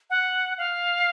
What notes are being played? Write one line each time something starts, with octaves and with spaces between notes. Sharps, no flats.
F#5
F5